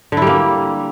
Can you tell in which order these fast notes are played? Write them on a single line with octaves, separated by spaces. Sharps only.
D3 E4 G3 A#3